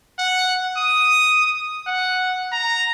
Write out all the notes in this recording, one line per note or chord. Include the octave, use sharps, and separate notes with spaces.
F#5
D#6
F#5
A#5